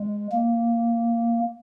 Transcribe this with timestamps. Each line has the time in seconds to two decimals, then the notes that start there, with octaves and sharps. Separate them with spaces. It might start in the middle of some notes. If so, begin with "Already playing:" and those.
Already playing: G#3
0.32 A#3